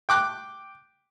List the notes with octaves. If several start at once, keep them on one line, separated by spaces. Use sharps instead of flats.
G5 D6 F#6